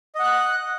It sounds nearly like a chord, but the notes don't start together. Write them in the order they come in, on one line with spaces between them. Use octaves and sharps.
D#5 F#5 F#6